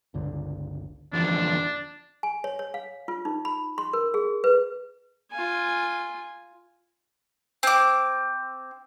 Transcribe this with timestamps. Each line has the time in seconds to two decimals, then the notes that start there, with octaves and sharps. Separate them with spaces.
0.14 G1 C#2 D3
1.13 E2 D3 F3 D4
2.23 G#5
2.44 C#5
2.59 C#5
2.74 F5
3.08 F4
3.25 D#4
3.45 B5
3.78 C6
3.93 A#4
4.14 G#4
4.44 B4
5.32 F4 G#5
7.63 C4 D6